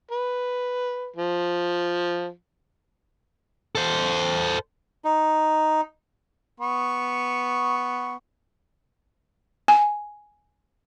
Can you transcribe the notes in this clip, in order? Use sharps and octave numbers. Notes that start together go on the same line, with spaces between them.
B4
F3
A4 C5
D#4
B3 C#6
G#5